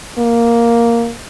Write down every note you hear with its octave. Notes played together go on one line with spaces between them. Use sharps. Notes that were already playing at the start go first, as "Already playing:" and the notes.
A#3